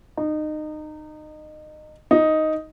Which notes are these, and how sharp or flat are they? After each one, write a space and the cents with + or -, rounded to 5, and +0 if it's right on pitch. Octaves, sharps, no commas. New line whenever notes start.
D#4 -25
D#4 +5